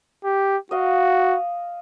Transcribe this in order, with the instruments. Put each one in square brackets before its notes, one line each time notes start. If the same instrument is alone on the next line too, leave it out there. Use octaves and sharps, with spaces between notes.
[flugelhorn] G4
[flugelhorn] F#4 [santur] D#5 F5